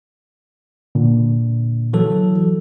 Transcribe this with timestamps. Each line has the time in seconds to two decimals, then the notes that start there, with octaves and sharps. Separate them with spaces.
0.95 A#2 D3
1.93 E3 F#3 A4